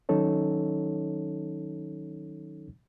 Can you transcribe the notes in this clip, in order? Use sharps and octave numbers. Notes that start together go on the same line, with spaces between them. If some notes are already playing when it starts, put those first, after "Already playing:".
D#3 F#3 C#4 D#4 A4 C#5